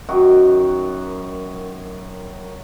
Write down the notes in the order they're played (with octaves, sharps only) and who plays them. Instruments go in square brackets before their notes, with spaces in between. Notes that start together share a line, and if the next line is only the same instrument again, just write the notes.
[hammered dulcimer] F#2 D#3 F#4